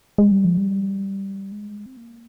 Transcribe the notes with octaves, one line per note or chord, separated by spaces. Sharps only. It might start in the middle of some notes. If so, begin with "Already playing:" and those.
G#3
G3
F3
G3
G#3
C4
A#3